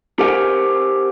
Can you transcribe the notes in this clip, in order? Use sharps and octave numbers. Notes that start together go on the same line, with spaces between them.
G4 A#4 C5 F5 F#5 G#5